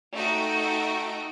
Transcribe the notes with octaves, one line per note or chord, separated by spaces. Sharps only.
A3 D#4 F#4 D#5 G5 D7